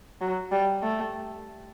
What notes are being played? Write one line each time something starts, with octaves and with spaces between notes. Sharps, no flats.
F#3
G3
A3